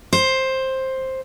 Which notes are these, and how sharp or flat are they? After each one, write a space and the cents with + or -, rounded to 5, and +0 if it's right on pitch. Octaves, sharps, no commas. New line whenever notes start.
C5 +10